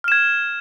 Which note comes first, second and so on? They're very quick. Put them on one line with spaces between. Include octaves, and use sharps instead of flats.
F6 E7 G#6